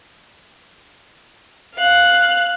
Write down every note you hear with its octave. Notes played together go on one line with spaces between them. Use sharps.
F5 F#6